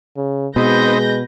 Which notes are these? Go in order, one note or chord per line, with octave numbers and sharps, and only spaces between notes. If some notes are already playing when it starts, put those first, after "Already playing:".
C#3
B2 G#3 B3 C4 D#4 B4 G6 A#6